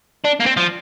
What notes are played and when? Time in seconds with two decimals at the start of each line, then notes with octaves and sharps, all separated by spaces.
0.24 D4
0.40 A#3
0.46 C4
0.57 F3